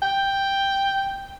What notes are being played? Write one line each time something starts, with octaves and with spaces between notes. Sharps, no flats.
G5